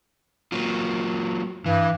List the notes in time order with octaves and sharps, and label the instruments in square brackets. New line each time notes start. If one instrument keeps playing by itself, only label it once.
[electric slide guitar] F#3 A#3 F4
[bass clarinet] G2 [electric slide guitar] E3